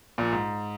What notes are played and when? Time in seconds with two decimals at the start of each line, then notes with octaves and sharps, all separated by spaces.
0.18 A#1 A#2
0.33 G#2